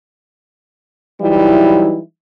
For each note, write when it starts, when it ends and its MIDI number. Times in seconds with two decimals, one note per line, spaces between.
1.21 1.99 52
1.21 1.99 54
1.21 1.99 55
1.21 1.99 63
1.21 1.99 64